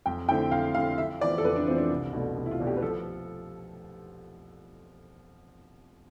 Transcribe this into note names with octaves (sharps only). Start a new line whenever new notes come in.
F2 G5
D3 A3 C4 E4 G5
F2 F5
D3 A3 C4 E4 F5
F2 E5
E3 B3 F4 C5 D5
A4
F2 B4
D4
E3 B3 C4 F4 C5
D4
C2
B2 A3 D4
C2
E4
F4
B2 A3 D4
G4
B4
F3 A4